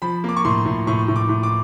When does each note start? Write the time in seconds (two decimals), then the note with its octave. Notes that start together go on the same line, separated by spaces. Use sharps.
0.02 F3 B5
0.24 A#3 D6
0.36 C#6
0.45 A2 C6
0.65 A2
0.87 A2 C#6
1.08 A2
1.16 D6
1.29 A2
1.43 D6